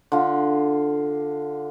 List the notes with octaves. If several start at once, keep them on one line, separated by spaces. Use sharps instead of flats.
D3 F4